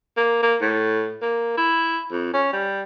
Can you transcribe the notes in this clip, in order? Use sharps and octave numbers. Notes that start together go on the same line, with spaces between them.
A#3
A#3
A2
A#3
E4
F2
C#4
G3